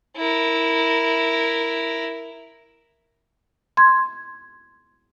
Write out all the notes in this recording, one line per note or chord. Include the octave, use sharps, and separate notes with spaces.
E4 A#4
C6 G#6